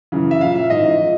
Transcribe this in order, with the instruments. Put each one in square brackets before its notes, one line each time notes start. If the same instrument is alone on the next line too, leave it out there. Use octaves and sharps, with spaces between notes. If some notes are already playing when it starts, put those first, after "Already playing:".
[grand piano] F#2 C#3 E3
E5
A#2 F3 F5
E5
G#2 E3 D#5
F3